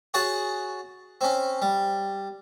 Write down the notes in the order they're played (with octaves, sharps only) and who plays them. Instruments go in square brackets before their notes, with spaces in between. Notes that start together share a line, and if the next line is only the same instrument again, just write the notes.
[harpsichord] F#4 G#4 C#5 F#5 A5
C4 C#4
G3